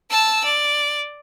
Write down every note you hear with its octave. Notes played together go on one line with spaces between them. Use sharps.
A5 E6
D5